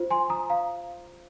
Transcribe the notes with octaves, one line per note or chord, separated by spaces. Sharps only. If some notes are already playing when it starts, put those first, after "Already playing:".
Already playing: F4 C5
G#5 C6
A#5 D#6
F5 A#5